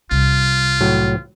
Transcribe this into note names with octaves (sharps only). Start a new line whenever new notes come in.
C2 F4
A2 F#3